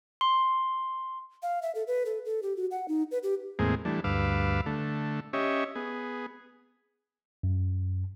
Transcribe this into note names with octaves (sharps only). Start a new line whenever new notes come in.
C6
F5
E5
A4
B4
A4
A4
G4
F#4
F#5
D#4
B4
G4
E2 A2 G#3 A#3 C4 G#4
E3 G3 A3 D4
D2 G2 B4 F5 D6 E6
D3 A3
C#4 G4 C#5 D#5 E5
B3 G#4
F#2